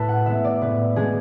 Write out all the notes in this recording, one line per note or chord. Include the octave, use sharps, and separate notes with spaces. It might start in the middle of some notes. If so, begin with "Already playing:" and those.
Already playing: A2 A4 B4
F#5
G#3 B3 E5
D5
A2 B4
G#3 B3 G#4